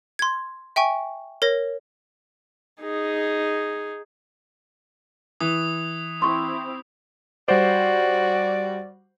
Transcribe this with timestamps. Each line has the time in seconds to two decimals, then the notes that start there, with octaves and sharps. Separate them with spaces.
0.19 C6 G#6
0.76 E5 G5 G#5 C#6
1.42 A#4 C#5 A#6
2.82 D#4 G#4
5.40 E3 D#6
6.22 C4 E4 C6 C#6
7.48 G3 F#4 C5 D5